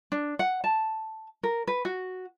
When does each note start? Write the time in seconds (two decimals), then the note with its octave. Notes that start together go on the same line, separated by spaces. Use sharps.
0.12 D4
0.39 F#5
0.64 A5
1.43 A#4
1.67 B4
1.85 F#4